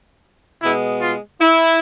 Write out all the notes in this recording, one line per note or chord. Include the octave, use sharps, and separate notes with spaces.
B2 G#3 B3 E4
F4
E4